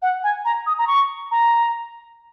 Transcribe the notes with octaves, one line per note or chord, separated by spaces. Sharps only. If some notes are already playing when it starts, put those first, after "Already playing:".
F#5
G#5
A#5
D#6
A#5
C#6
A#5